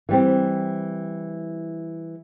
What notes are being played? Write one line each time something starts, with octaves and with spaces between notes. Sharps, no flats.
E3 G3 C4